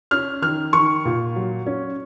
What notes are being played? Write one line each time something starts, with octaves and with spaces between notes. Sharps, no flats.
C#4 F6
D#3 F6
D#3 C#6
A#2
F#3
C#4